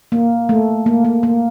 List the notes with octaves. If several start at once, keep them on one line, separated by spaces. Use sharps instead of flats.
A#3
A3
A#3
A#3
A#3